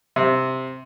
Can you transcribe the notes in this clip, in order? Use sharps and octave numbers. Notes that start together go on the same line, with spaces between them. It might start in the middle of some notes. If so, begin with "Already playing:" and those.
C3